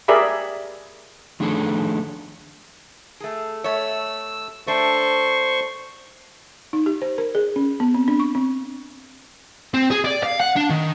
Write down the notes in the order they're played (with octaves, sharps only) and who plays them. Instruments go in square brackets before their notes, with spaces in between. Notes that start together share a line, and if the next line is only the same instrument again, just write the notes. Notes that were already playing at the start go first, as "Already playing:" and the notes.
[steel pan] G4 G#4 A#4 D5 E5 B5
[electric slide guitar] D#3 F3 A3 D4 G#4 A4
[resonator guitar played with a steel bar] A3 G#4
[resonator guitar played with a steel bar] A3 C#5 [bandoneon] E6
[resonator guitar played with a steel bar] A3 D4 [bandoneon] C5 C#6
[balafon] D#4
G4
C5
A#4
G#4
C#4
B3
C4
D4
C#6
C4
[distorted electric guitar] C4
G#4
D5
F5
F#5
D4
D#3